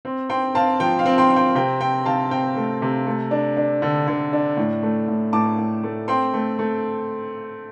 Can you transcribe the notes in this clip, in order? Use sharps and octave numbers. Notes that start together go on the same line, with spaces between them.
C4
C4 G5 C6
C4 F5 A5
F3 G5
F5
C4
G5 C6
C4
G5 C6
C3 G5
C4 G5
C3 F5 A5
C4 G5
A3
C3
A3
D4
D4
D3
D3
D4
A2
A3
A2
A2 A5 D6
A2
A3
C4 G5 C6
A3
A3